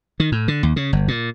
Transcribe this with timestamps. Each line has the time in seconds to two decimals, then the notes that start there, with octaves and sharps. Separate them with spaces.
0.20 D#3
0.32 A2
0.48 D3
0.63 D#2
0.76 C#3
0.93 G1
1.08 A#2